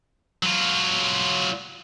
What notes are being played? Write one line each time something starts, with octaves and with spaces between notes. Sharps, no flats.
F#3 F4